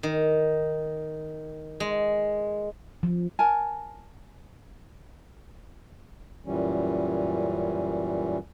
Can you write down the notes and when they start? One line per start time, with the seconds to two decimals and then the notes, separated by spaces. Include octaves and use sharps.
0.03 D#3
1.80 G#3
3.03 F3
3.39 A#4 G#5 A5
6.46 F#2 A#2 E3 G3 C#4